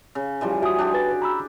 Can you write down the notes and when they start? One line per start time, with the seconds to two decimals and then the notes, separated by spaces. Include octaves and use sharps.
0.15 C#3
0.41 E3 F3 G3
0.62 F#4 E5 G5 G#5 D#6
0.79 D4 G4 G#4
0.94 B4 A6
1.22 A#5 B5 E6